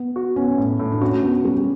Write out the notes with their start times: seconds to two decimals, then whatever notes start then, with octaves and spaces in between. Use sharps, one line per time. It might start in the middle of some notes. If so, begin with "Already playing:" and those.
Already playing: B3
0.16 F#4
0.36 B3 C#4
0.58 A2
0.79 A2
0.92 D4
1.01 C#4 F#4
1.23 B3 F#4
1.45 G3 C#4